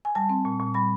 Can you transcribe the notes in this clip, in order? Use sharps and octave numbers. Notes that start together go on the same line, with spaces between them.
G#5
G3 A5
C4
A#2
A#2
G3 B5